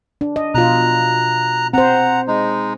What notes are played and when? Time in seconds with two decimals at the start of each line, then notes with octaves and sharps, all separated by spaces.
0.21 D4
0.36 D#5
0.54 B2 F4 A#5 F#6
1.73 C4 C5 F#5 A#5
2.27 G#3 D#4